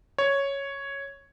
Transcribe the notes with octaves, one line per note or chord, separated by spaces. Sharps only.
C#5